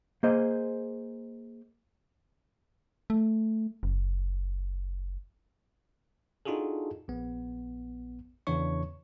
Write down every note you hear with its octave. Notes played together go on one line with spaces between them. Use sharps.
A#3 G#4 C5 D#5
A3
F#1
D4 D#4 F4 F#4 G#4 A4
A#1 B3
E2 C#3 E3 D4 C#5 C#6